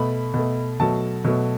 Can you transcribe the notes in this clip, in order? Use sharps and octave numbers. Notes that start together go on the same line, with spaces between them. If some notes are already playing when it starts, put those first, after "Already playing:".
Already playing: B2 A3 B5
B2 A3
B2 F#3 A3 A5
B2 F#3 A3